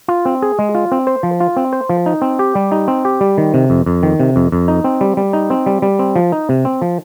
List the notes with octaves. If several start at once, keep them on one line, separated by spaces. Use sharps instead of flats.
F4
C4
G#4
G#3
F4
C4
C5
F3
F4
C4
C5
F3
D#4
C4
G4
G3
D#4
C4
G4
G3
D#3
C3
F2
F2
D#3
C3
F2
F2
D#4
C4
G3
G3
D#4
C4
G3
G3
C4
F3
D#4
C3
C4
F3